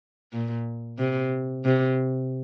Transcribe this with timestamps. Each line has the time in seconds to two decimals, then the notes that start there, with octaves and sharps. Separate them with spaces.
0.33 A#2
0.99 C3
1.65 C3